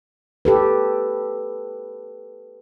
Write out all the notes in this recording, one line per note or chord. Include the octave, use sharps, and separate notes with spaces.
G4 A4 B4